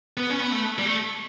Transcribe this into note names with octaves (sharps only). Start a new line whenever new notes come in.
B3
C#4
B3
A3
G3
A3